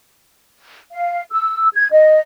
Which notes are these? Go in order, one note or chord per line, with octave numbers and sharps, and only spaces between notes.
F5
E6
G#6
D#5